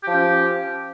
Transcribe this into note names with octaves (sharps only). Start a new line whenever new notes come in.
F3 C#4 G4